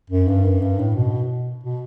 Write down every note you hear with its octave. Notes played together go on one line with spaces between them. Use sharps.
F#2
G2
F#2
G2
A2
B2
B2